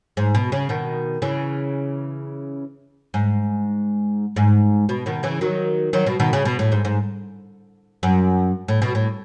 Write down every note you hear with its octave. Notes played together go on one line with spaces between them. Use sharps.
G#2
B2
C#3
B2 D#3
C#3 E3
G#2
G#2
B2
B2 D#3
C#3 E3
D#3 F#3
D#3 F#3
B2
B2 D#3
C#3
B2
A2
G#2
G#2
F#2
A2
B2
A2